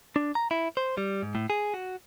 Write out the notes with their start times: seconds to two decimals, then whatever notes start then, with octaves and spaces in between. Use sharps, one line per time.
0.16 D4
0.35 A#5
0.51 E4
0.77 C5
0.98 G3
1.23 G#2
1.35 A2
1.50 G#4
1.74 F#4